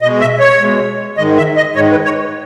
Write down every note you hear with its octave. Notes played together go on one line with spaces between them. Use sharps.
B2 G#3 D#5
E5
C#5
B2 G#3
G#2 D#3 G#3 D#5
E5
D#5
G#2 D#3 G#3 C#5
B4
C#5